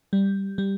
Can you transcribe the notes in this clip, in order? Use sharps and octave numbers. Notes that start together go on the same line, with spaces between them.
G3
G3